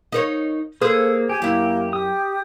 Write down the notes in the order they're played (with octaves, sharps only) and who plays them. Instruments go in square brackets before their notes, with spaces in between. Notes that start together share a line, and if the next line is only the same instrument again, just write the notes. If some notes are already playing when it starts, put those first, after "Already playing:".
[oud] D#4 A#4 C#5
[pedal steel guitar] A#3 [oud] G#4 B4 C5 [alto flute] A4
[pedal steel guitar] G4 [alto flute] G#5
[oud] F#2 E4 [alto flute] A#3
[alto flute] G4 [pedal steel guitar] D#6